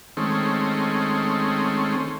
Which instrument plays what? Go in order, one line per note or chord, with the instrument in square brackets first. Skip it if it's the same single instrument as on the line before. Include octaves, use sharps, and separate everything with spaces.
[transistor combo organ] D#3 G#3 A3 C4 C#4